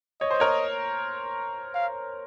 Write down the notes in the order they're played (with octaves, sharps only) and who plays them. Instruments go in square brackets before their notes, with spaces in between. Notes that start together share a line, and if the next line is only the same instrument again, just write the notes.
[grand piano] C#5 [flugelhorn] D#5
[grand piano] C5
A#4 C#5
[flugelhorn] F5